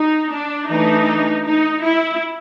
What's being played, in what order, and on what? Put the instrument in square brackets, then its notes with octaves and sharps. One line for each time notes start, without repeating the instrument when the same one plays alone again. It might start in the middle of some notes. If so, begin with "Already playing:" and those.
Already playing: [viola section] D#4
D4
E3 A3 D4 D#4
D#4
E4